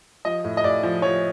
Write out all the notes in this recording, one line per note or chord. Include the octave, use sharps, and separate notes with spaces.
F3 D#5
A2
D#5
A2 D5
F3
F3 C#5